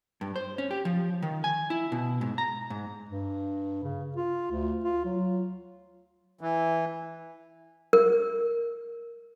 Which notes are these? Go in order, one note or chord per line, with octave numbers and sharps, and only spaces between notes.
G2
C5
C#4
G4
F3
D#3
G#5
E4
B2
G#2
A#5
G#2
G2
C#3
F4
D2
F4
F#3
E3
A#4